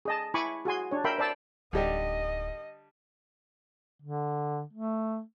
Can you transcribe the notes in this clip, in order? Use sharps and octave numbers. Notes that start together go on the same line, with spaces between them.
G#4 D#5 A5
E4 G#5 B5 C#6 D6
F#4 G#4 G#5 C6
D4 C#5
A#4 E5 G5 B5 C6
C5 D5 A5 E6
D1 D3 G3 D#4 G4 D#5
D3
A3